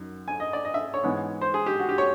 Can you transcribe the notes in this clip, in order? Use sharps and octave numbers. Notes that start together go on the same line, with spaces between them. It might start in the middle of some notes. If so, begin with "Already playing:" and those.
Already playing: F#2 D#3
G#5
D#5
D5
D#5
E5
C#5
G#2 E3 G#3 B3
C5
G#4
G4
F#4
G4
C#5